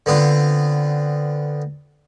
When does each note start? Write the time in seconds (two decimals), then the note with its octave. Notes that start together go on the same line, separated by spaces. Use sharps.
0.06 D3 B3 C4 D4 F4